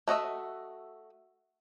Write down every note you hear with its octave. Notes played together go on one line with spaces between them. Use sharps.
A3 F#4 D#5 E5